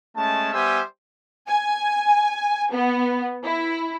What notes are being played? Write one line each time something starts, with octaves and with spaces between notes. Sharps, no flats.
G#3 A3 C#4 A5
G3 B3 C5 E5 G#5
G#5
B3
E4